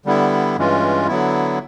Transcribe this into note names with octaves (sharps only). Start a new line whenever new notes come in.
D3 G3 B3 E4
G2 E3 G#3 C#4 F4
D3 F#3 B3 E4